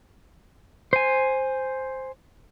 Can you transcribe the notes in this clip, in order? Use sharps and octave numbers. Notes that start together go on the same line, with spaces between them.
C5 G#5